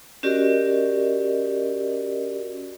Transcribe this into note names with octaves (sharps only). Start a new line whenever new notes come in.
C#4 F#4 G4 A#4 D5 D#5